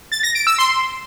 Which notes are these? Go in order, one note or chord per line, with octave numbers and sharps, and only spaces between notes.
A6
A#6
D7
E6
C6